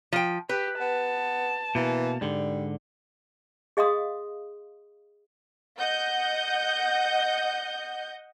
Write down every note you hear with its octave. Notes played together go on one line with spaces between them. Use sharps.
F3 G5
G4 B4
B3 A5
B2 E3 A#3
G#2 D3 G3
G#4 D#5 F5 C6 D#6
D#5 F#5 G6